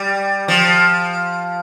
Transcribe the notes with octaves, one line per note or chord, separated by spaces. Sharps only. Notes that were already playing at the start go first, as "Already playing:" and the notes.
Already playing: G3
F3